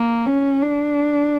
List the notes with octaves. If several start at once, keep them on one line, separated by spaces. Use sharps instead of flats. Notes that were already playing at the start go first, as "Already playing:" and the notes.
Already playing: A#3
C#4
D4